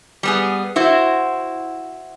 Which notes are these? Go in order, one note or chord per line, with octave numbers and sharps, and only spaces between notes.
G3 B3 G#4
E4 F#4 C5